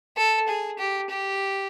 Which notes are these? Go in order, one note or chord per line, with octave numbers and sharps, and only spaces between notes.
A4
G#4
G4
G4